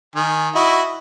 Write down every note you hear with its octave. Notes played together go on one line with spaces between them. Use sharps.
D#3 G#5
E4 F#4 D#5